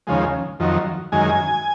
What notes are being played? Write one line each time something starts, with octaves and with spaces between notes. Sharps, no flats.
D#2 C#3 F3 G#3
F2 D#3 F#3
F#2 D#3 G#3 G#5